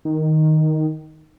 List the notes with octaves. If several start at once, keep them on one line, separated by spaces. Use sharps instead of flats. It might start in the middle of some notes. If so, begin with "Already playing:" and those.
D#3